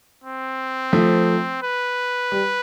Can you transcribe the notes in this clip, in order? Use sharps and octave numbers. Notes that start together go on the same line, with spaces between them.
C4
F3 A3
B4
G3